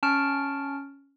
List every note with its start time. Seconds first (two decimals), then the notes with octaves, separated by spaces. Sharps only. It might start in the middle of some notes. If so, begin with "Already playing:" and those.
0.03 C#4 A5 C#6 F6 D7